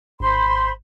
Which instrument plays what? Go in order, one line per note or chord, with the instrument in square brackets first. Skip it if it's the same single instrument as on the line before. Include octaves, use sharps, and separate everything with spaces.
[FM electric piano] G#1 [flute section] C5 B5 C6